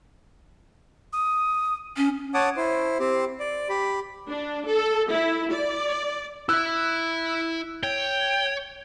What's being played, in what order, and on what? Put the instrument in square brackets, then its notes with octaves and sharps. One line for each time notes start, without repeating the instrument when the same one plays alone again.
[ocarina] D#6
[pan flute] C#4
[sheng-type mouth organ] C#5 F#5 A5 D6 D#6
E4 C5
C4 G4 C5
D5
G4 B5
[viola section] D4
A4
E4
D5
[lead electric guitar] E4 E5 [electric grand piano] E6 F#6
[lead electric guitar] C#5 [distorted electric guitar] G5